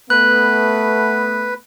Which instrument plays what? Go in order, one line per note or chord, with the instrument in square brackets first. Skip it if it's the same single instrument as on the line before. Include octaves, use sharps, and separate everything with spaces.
[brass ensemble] A3 B3 [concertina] B4 [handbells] F#6